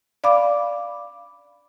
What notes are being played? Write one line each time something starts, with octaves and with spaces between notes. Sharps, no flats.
D5 F5 B5 D6